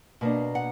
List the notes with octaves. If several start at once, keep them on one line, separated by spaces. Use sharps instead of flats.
B2 A#3 D4
F#5